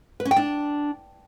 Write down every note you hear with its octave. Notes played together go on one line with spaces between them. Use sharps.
B4
C#4
G5
D4